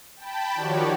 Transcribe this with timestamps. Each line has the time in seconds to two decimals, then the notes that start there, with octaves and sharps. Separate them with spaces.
0.17 G5 A5 B5
0.55 D#3 F3 F#4 G4 C#5 D5